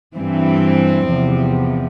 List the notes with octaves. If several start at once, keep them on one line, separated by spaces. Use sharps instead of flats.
G2 E3 C4
E2 C3 F3